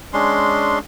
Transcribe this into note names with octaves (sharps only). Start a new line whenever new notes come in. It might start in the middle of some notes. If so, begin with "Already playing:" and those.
G#3 C#4 D4 C6